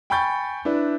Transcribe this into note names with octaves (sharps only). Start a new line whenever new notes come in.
G5 G#5 B5 C#6 G6 A6
D4 E4 B4